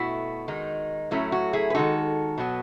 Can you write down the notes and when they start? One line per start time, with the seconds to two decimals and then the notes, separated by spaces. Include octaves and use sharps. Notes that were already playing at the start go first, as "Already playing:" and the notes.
Already playing: B2 A3 E4 F#4
0.48 D#3 G#3 D#4
1.11 A2 F#3 A3 C#4 E4
1.32 F#4
1.53 E4 G#4
1.70 B4
1.75 D#3 G#3 D#4 F#4 A4
2.38 B2 F#3 B3